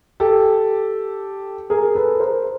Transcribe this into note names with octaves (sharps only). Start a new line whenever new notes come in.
G4 A4
G#4 A#4
A4 B4
A#4 C5